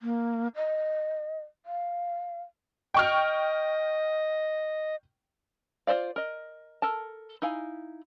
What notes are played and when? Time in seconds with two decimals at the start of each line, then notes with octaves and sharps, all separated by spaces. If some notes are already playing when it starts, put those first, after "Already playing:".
0.01 A#3
0.56 D#5
1.66 F5
2.94 D#5 G5 C#6 F6
5.87 F4 A4 C5 D5 F5
6.16 A#4 D#5
6.82 A4 A#4 A5
7.42 D#4 E4 F5 G#5